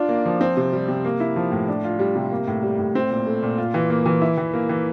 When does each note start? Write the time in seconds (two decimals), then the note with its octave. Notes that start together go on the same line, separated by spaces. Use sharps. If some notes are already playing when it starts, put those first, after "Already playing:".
Already playing: D4 F4
0.09 A#3
0.25 F3
0.41 C4
0.57 C3
0.73 G3
0.88 C3
1.05 A#3
1.20 E4
1.36 F3
1.52 A2
1.68 D4
1.84 F4
1.99 G3
2.16 C3
2.31 A#3
2.47 A2
2.62 G3
2.79 A2
2.95 C4
3.11 A#2
3.26 A3
3.42 A#2
3.58 F4
3.74 E3
3.90 A#3
4.06 E3
4.22 E4
4.37 E3
4.53 A#3
4.69 E3